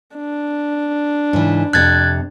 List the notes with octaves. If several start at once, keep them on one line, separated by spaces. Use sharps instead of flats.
D4
G#2 C#3 E3
F2 C3 F#6 G#6 A6